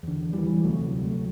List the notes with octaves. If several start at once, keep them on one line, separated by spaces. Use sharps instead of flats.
E2 D3
E3 G3
D2 C3 F#3 A3
F#3 A3